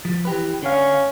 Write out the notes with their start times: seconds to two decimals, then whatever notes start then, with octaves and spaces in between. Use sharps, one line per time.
0.05 F3
0.25 E3 G4 B4
0.62 D3 C#4 F5